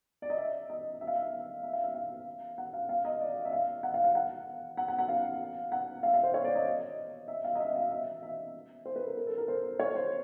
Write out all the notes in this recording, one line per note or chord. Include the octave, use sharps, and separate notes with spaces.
D5
D#5
E5
D#5
E5
F5
E5
E5
F5
E5
F5
F#5
F5
F5
D#5
D5
E5
F5
F#5
F5
F5
F#5
F#5
F#5
F#5
F5
F#5
F5
E5
F5
C5
C#5
D5
D#5
E5
F5
D#5
E5
F5
E5
E5
C5
B4
A#4
A#4
A4
A#4
C5
C#5
C5